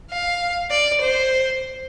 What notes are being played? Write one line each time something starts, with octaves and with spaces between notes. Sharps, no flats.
F5
D5
C5